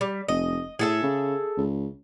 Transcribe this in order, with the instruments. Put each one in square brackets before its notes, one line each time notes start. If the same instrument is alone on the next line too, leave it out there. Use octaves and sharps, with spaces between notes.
[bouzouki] G3
[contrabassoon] F1 [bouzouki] D#5
[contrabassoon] A2 [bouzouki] G#4 A4 E5
[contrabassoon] C#3
C#2